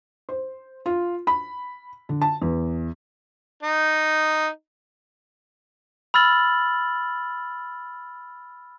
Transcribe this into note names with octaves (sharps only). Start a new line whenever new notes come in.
C5
F4
B5
D3
A5
E2
D#4
B5 E6 F6 A6 F#7